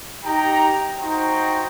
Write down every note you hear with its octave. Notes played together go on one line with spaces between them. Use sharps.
D#4 G4 G5 A#5
D#4 F#4 C5 G5 A#5